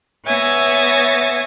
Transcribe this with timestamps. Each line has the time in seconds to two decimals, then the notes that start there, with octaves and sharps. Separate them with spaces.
0.24 B3 C#5 E5 G#5 A6 A#6